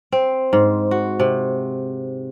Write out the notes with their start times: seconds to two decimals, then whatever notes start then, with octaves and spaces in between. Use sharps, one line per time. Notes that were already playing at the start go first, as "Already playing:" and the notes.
0.12 C4
0.53 G#2
0.91 F#4
1.20 C3